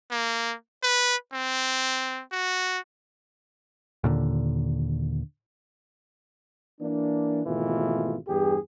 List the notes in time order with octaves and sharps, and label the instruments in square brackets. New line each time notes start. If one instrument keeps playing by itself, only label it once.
[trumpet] A#3
B4
C4
F#4
[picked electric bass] D#2 A#2 D3
[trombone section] E3 A#3 D4
G#1 B2 E3 A3 F4
E2 G2 G4 G#4